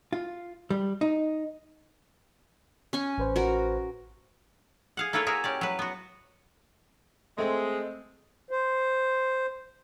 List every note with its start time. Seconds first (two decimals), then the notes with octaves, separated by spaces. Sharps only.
0.13 F4
0.70 G3
1.01 D#4
2.93 C#4 G#5 C#6
3.18 A1 B4 C5
3.36 F#4 A#4
4.97 G#4 F5 F#5
5.13 A#3 E4 A4 B4 C#5
5.26 F#4 G#4 A#4 E5
5.44 C#4 G4 D5
5.61 F#3 B4
5.79 B3 F#4
7.38 G#3 A3 C4
8.51 C5